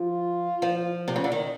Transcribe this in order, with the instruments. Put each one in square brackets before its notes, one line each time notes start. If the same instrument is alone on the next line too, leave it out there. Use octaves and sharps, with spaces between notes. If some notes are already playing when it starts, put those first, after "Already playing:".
Already playing: [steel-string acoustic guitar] F3 [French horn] F4
[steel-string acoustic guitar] F3
C3
C#3
D3
D#3